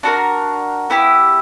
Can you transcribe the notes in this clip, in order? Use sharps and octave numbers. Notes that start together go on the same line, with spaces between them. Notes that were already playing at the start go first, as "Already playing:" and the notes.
D4 F#4 A#4
B3 E4 G4